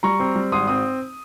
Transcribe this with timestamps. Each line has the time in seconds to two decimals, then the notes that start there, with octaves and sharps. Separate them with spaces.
0.03 G3 A#5 C#6
0.20 C4
0.35 G3
0.52 G#1 C6 D#6
0.67 C4 D#6